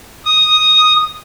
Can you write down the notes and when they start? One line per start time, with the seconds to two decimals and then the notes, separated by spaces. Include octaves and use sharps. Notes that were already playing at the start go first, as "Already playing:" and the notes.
0.25 D#6